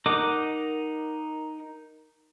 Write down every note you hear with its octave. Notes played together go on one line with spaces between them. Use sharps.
D#4 A#4 D#5 F#5 D6